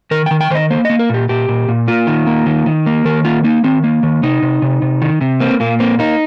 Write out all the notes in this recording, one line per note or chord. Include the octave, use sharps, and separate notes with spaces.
D#3 A#4
D#3 G5
G5
D#3 C5 D#5
A#3 C5
A#3 D#5
A#4
A#2 G4
A#2 G4
A#2
A#2
A#3 F4
D#3
A#3
D#3
D#3
A#3
D#3 A#4
A#3 F4
A#3 D#4
D#3 C4
A#3
D#3
C3 D#4
C3
C3
C3
D#3
C3
A#3 C4
A#2 A#3
A#3 C4
A#3 D#4